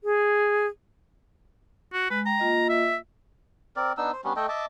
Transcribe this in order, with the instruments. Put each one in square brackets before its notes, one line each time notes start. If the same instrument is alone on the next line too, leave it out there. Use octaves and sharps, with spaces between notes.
[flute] G#4
[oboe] F#4
[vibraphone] G#3 [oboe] B4
[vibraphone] G5 [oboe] A#5
[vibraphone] A#3 F4 D#5
[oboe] E5
[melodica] C4 A#4 D5
B3 D4 D#4 E6
C5
G3 B3 C#4 D4
A3 A4 D#5 G5
D#5 E5 A5 D6